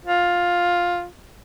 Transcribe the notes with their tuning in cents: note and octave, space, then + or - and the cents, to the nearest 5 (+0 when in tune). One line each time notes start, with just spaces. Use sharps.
F4 +10